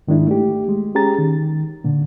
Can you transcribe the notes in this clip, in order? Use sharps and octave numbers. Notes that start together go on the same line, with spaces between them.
G#2 D#3 G#3 D4 E4
A3 G4
G#3
C#4 G4 G#4 A#5 A6
D#3
A#2 D3